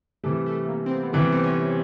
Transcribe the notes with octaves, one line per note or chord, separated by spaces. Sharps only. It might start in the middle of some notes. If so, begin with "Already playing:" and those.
C3 E3 G3 A3
A3
A#3
C4
B3
B3
C3 E3 G3 C4
C4
C#4